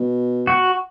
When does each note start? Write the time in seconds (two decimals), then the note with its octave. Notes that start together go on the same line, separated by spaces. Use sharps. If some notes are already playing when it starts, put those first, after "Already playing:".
Already playing: B2
0.47 F#4